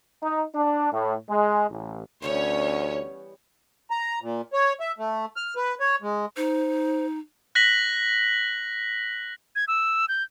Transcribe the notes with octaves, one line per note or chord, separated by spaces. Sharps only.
D#4
D4
A2
G#3
A1
D2 E3 G3 B3 C#4 C#5
A#5
A#2
C#5
E5
A3
F6
B4
C#5
G#3
D#4 C5
F#6 A#6 B6 F#7
G#6
E6
G6